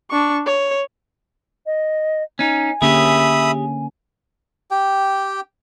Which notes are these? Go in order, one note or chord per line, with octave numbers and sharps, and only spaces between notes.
D4 C#6
C#5
D#5
C#4 D#4 G#5
D3 A#3 C#4 G4 G#4 E5 B5 D#6
G4 G5